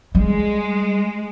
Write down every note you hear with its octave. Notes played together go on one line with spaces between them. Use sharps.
G3 G#3